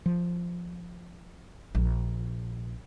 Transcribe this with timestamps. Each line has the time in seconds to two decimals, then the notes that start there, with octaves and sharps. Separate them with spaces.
0.06 F3
1.75 A#1